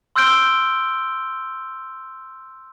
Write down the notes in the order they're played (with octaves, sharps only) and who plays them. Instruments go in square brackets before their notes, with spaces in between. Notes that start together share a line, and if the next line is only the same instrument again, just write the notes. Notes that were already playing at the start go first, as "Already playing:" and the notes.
[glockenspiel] C6 E6 F6 G6 D7 G7